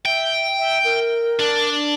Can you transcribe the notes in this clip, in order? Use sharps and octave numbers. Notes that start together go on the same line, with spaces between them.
E5 G5
E5
A#4
D4